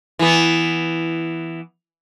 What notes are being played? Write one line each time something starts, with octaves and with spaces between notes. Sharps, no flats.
E3 B3